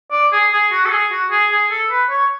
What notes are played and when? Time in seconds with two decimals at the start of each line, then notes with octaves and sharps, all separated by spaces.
0.12 D5
0.33 G#4
0.52 G#4
0.72 F#4
0.86 A4
0.91 G#4
1.11 F#4
1.31 G#4
1.52 G#4
1.71 A4
1.90 B4
2.11 C#5